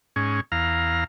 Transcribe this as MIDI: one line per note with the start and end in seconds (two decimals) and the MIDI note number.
0.16 0.41 44
0.16 0.41 61
0.52 1.04 40
0.52 1.04 77
0.52 1.04 82